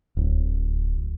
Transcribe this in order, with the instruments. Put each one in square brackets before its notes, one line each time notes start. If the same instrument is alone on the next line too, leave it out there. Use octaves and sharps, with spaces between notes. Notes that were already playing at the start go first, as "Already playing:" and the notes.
[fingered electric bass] D1